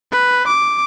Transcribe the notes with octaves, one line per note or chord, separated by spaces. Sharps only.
B4
D6